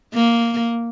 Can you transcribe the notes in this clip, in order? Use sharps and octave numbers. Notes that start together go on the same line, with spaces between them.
A#3